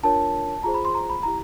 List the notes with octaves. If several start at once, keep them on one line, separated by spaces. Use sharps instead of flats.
D4 F4 A#4 C#5 A5
F4 G#4 C5 A#5
B5
C6
A#5
B5
E4 G4 A#5